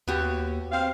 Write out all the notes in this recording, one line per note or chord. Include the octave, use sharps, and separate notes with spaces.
D#2 B3 F#4 G4
C4 F5